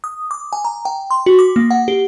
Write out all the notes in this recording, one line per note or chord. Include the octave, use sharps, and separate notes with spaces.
D#6
D6
G#5
A#5
G5
C6
F#4
D6
A#3
F#5
G4